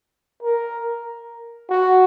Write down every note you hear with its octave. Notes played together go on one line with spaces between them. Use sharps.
A#4
F#4